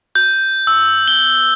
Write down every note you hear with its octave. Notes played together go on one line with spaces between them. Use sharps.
G6
E6
G7